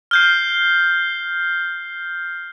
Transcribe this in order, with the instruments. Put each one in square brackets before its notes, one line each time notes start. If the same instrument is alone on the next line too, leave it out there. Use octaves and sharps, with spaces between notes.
[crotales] F6 G6 C7